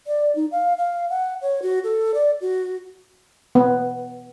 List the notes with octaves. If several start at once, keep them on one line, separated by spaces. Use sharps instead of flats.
D5
D#4
F5
F5
F#5
C#5
F#4
A4
D5
F#4
B3